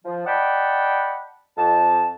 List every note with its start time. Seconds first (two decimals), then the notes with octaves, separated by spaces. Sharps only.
0.05 F3
0.27 D5 D#5 F#5 G5 A5 B5
1.57 F2 A5